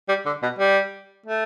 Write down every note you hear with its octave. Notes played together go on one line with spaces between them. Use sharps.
G3
D3
B2
G3
A3